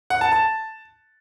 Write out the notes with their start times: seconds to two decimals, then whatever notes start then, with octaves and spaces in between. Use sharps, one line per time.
0.10 F#5
0.21 A5
0.32 A5